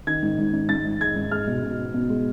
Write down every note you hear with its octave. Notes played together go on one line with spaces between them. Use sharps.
D#3 G#6
G#2
G#2
G#2
G#2 A6
G#2
G#3 G#6
G#2
G#3 F6
B2
B2
B3
B2
G#3